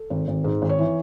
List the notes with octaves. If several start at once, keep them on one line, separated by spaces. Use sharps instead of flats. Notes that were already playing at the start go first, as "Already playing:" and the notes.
Already playing: A4
G#1
G#1
G#2
G#1
C#5
E3